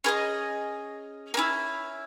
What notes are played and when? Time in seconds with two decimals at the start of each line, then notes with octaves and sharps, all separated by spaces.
0.04 C#4 G#4 B4 D#5
1.34 A#3
1.37 C#4 E4